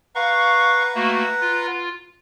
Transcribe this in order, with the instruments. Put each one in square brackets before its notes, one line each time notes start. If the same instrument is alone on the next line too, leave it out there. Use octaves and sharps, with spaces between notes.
[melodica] B4 F#5 A#5 [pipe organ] F5 C#6
[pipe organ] A3 A#3 F#4
F4